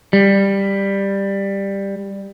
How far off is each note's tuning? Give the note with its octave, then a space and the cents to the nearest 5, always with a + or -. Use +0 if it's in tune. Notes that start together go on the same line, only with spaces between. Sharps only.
G3 +10